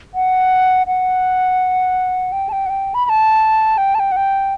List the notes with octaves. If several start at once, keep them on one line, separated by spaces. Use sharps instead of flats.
F#5
F#5
G5
A5
G5
F#5
G5
B5
B5
A5
G5
A5
G5
F#5
G5